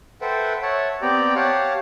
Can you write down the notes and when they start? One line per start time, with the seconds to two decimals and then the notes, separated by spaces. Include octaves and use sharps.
0.21 A4 B4 C5 E5 F#5 G5
0.62 C#5 E5 F#5 A5
1.02 B3 C4 G4 D5 G5 A#5
1.36 G4 C#5 F5 F#5 A5